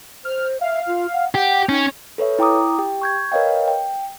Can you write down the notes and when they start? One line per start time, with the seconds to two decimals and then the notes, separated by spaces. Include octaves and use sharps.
0.25 C5 F6
0.61 E5 F5
0.87 F4
1.13 F#5
1.35 G4 F#5 G5
1.69 C#4 D#4
2.18 A4 B4 C#5 E5
2.39 E4 G5 A#5 D6 D#6
2.78 G4 G5
3.02 C#6 G6 G#6
3.32 A#4 B4 C#5 D#5 F5 G5
3.68 G5